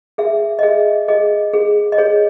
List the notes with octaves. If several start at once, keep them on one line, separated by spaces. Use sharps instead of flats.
G#4 E5
D#5
G#4 E5
G#4 D#5
G#4
D#5
G#4 C#5